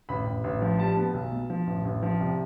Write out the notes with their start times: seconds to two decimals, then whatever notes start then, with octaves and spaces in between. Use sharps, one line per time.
0.09 A1 B5
0.26 A1
0.44 A1
0.62 F3
0.79 G3 A5
0.97 B3
1.14 B1
1.31 B2
1.50 F3
1.67 A1
1.85 A1
2.03 F3
2.20 C2